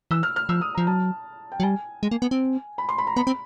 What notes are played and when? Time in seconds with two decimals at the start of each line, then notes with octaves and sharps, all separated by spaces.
0.11 E3 E6
0.23 F6
0.36 F6
0.49 F3 E6
0.61 D#6
0.75 F3 A#5
0.87 F#3 A5
1.52 G5
1.60 F#3
1.63 G3 G#5
2.03 G#3
2.11 A#3
2.22 B3
2.31 C4
2.78 B5
2.89 C6
2.98 B5
3.07 A#5
3.16 B3 B5
3.27 C4